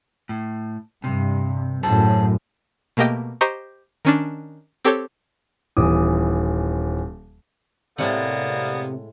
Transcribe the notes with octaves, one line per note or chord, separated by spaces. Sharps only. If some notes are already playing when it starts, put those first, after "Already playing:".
A2
G2 C3
F#2 A2 G#4 C5 A5
B2 A3 A#3 G4 D#5 G5
G4 C5 D#5 A#5 C#6
D#3 C#4 D4
C4 G4 A4 C#5 G6
D#1 E3 D6 D#6
A2 C3 G#3 A#3 B3 D5 F#5